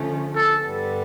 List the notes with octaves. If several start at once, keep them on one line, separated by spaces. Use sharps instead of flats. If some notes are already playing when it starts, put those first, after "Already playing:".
Already playing: D3 F3 A3 C#4
A4
G2 D3 G3 B3